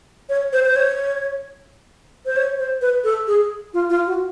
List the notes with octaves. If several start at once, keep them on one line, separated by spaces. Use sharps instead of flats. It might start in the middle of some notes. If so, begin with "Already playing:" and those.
C#5
C5
C5
C#5
C5
C#5
C5
B4
A4
G#4
F4
F4
F#4